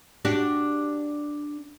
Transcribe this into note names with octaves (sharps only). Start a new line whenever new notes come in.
D4 F#4 G4